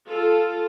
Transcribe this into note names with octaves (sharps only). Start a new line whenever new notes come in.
F4 A4